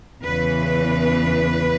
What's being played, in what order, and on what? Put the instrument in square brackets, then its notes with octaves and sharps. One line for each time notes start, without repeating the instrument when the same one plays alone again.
[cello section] E2 C#3 E3 B4